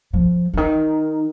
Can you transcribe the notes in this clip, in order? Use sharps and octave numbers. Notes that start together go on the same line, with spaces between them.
F3
D3
D#3